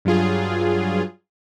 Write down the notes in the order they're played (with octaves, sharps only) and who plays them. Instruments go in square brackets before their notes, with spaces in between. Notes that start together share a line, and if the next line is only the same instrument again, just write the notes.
[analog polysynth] G2 F#3 F4 G#4